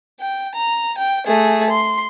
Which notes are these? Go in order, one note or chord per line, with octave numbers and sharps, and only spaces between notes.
G5
A#5
G5
A3 G#4
C6